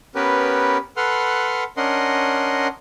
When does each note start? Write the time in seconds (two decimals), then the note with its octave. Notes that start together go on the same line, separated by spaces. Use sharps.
0.15 B3 C#4 G4 A#4 B4
0.97 A4 B4 F#5 C6 F6
1.77 C#4 D4 A#4 D#5 F#5 C6